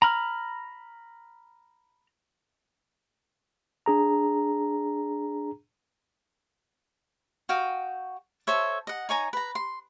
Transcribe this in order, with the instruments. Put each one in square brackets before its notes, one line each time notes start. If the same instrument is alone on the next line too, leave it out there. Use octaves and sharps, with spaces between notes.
[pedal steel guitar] A#5 B5 F6
[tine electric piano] D4 G#4 A#5
[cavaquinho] F#4 F5 G5 D#6
A4 C5 C#5 E5
D#5 F#5
D#4 C#5 G#5 A#5
B4 A#5
C6